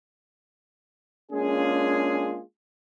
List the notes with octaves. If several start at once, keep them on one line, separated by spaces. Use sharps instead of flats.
G#3 A#3 C#4 D4 F4 G#4